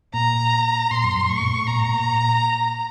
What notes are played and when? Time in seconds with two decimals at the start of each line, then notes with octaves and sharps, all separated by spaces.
0.14 A#2 A#5
0.91 A#2 C6
1.04 F#2
1.16 F#2
1.29 A2 C#6
1.40 A#2
1.51 A2
1.67 A#2 A#5
1.80 A#2
1.94 A#2